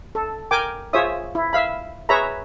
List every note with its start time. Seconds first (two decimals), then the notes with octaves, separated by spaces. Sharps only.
0.15 A4
0.51 A#4 G5 G#5 D6
0.93 F4 G#4 C5 C#5 E5 D#6
1.35 E4
1.53 E5 F5 B5
2.09 G#4 B4 C#5 E5 A#5 B5